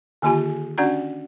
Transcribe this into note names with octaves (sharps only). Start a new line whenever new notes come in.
D3 D#3 A#3 F4 G4 G#5
C#4 D4 F#4 D5 F#5 A#5